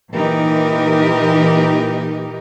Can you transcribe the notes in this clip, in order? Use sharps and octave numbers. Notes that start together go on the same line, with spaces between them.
A#2 E3 D#4 G4 A#4